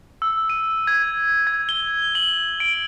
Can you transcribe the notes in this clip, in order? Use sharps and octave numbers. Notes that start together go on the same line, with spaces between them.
E6
D#7
G#6
G#6
G7
F#7
D7